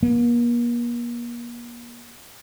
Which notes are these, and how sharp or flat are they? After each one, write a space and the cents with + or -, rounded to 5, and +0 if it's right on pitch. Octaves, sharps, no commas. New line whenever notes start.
A#3 +40